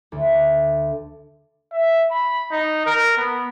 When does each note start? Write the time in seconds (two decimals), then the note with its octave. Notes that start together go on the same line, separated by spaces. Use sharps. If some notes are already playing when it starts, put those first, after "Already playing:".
0.12 D2
1.72 E5
2.11 B5
2.51 D#4
2.86 A#4
3.17 B3